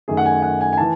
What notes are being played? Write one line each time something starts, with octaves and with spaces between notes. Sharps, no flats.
F#2 D#3 A3 G#4
F#5
G#5
F#5
G#5
G#5
E3 A5